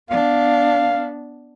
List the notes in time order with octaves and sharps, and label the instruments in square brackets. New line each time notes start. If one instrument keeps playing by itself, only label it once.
[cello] B3 D4 [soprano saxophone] F5